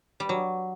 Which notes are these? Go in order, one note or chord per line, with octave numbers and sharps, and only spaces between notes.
G3
F#3